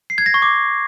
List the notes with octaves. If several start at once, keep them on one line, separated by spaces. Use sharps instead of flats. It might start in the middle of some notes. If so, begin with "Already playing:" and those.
C7
G#6
A#6
C#6
D6